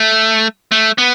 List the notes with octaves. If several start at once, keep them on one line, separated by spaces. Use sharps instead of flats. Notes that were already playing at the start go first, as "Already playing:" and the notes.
Already playing: A3
A3
B3